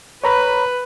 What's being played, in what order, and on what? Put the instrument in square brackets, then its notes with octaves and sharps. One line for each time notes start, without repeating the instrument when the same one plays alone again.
[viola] B4 [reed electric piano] C#5 A#5 B5